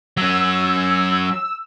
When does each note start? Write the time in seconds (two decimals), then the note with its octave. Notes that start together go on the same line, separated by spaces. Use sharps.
0.17 F#3 C#4 E6